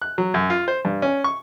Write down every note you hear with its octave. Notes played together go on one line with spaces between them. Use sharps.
F#6
F#3
F#2
F4
C5
G2
C#4
C#6